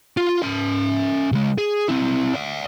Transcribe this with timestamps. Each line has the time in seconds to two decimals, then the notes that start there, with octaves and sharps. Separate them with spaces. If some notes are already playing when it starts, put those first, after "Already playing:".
0.17 F4
0.42 C#4 E5
1.32 C#3 G#3
1.58 G#4
1.88 C4 E4
2.34 D5 E5